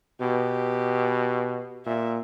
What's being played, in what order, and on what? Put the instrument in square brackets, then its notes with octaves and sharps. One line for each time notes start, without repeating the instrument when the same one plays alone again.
[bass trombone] B2 [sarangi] G4
[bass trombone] A#2 [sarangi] E5